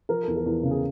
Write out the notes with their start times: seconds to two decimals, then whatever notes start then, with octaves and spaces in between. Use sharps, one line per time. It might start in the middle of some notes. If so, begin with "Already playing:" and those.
0.09 F3 A#4
0.23 E2 A4
0.37 A#4
0.46 E2
0.63 C#3
0.71 G#4